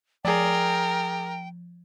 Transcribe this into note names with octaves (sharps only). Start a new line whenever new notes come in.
F3 G#4 A#4 D5 G5